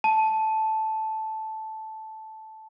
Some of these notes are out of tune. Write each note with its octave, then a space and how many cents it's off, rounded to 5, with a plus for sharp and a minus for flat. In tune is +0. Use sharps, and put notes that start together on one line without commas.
A5 -5